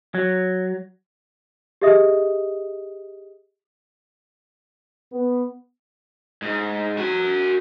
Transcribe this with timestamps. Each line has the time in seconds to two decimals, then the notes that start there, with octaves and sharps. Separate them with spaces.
0.15 F#3
1.81 G4 G#4 D#5 E5 D#6
5.11 B3
6.42 G#2
6.98 F#4 G#5